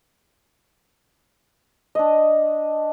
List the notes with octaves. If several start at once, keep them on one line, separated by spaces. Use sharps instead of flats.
D4 D#5